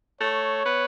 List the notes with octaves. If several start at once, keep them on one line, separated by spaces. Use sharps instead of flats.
A3 C#5
B3